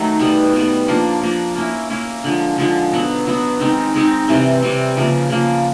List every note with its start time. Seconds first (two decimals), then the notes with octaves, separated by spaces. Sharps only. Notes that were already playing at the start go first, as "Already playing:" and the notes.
Already playing: D#3 F#3 A3
0.19 B2 G3 B3
0.54 B2 G3 B3
0.88 F3 A#3 D4
1.22 F3 A#3 D4
1.56 A#3 C#4 E4
1.90 A#3 C#4 E4
2.24 D3 F3 G#3
2.58 D3 F3 G#3
2.92 B2 F#3 B3
3.26 B2 F#3 B3
3.60 D#3 G#3 C4 D#4
3.94 D#3 G#3 C4 D#4
4.28 C3 E3 G3 C4
4.62 C3 E3 G3 C4
4.97 C#3 F3 A#3
5.30 C#3 F3 A#3